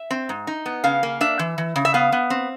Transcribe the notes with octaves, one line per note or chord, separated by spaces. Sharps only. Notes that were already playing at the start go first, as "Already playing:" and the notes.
Already playing: E5
C4
G#2
D#4
B3
C#3 F5
A#3
D4 E5
E3
E3
C#3
E5
B3 F5
B3
C4